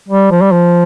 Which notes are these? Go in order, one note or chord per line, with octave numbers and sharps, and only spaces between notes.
G3
F3
G3
F3